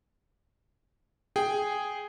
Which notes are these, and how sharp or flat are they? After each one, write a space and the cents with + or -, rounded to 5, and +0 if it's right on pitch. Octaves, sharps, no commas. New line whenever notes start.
G#4 +0 G5 +0